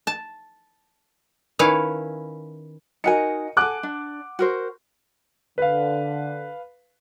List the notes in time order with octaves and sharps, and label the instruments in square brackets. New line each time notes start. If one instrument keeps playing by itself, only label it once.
[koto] A5
D#3 C#4 E4 B4 F5
[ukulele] D#4 F#4 G#5 [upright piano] A#4 D#5 C#7
[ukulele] G#4 A4 [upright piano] F#5 D6 F#6
[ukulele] D4
F#4 A#4 C5
[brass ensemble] D3 [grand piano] B4 F5